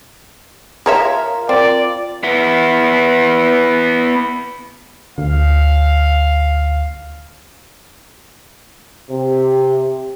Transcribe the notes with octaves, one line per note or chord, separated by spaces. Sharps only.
F4 G#4 A#4 C#5 E5
C4 D5
B3 E4
D2 F5
C3 G4